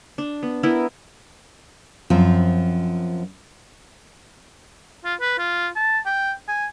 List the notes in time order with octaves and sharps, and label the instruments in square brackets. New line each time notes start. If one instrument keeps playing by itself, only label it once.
[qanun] D4
B3
B3 E4 A#4
[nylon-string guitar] F#2 F3 C4 F4
[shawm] F4
B4
F4
A5
G5
G#5